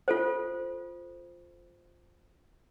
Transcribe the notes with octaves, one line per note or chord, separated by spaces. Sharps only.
F4 A4 C5